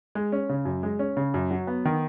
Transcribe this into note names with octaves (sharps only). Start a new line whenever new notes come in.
G#3
C#4
C#3
F#2
G#3
C#4
C#3
F#2
F#3
B3
D#3